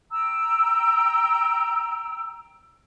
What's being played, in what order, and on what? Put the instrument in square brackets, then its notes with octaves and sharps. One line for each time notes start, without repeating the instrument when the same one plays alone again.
[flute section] G5 A#5 E6